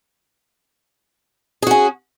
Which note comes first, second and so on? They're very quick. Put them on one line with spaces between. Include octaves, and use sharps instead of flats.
G#4 F#4 C#4